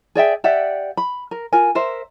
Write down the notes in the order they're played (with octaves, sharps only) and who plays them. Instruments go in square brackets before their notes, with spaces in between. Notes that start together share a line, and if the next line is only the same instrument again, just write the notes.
[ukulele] G#4 D5 E5 G5
G4 D5 E5 F#5
B5
A#4
F4 A#4 G#5
A#4 C5 E5